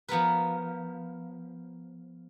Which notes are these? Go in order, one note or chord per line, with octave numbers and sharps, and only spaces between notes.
F3 B3 A#4 B4